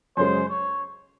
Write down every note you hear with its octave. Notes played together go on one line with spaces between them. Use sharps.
F#2 C#3 G#3 C5
C#5